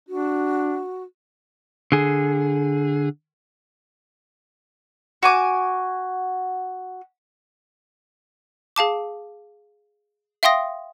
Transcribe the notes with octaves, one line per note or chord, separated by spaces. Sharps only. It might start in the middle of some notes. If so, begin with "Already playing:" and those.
D4 F#4
D3 G#4
F#4 G#5 D6
G#4 F5 A5 D6
E5 F5 G5 C6 D#6 A#6